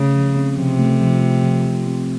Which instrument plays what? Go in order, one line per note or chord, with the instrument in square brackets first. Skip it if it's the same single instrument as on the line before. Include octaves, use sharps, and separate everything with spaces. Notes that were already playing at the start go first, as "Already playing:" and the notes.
Already playing: [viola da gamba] C#3 [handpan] A3
[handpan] F3
C4
[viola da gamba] C3 [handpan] F3
[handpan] A3
F3
A3
F3
F3
C4